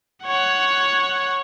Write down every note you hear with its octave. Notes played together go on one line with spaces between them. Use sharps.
C#5 F#5